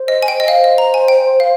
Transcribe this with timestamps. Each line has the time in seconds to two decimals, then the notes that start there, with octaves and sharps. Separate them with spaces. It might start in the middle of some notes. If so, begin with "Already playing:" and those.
Already playing: C5
0.08 D#5
0.22 G#5
0.28 G5
0.40 D#5
0.48 C5 F5
0.64 D#5
0.78 A#5
0.94 G#5
1.08 G5
1.40 F5